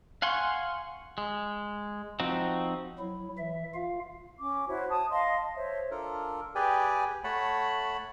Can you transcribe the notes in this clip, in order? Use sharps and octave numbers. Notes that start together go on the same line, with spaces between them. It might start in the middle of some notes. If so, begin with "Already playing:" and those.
F5 F#5 G#5 C6 C#6
G#3
F3 C4 D#4 F#4
F#3 E4
E3 E5
F4 F5
C#4 D6
E4 F#4 C5 C#5
A5 D#6
D#5 F5 A5 C6
A5
C5 C#5 E5
D4 F4 A4 A#4
G4 G#4 B4 D5 G5 G#5
A3 C#5 F#5 A5 B5